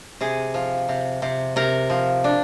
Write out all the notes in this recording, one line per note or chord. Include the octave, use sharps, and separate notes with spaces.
C3 G#4
F3
C3
C3
C3 A#4
F3
D4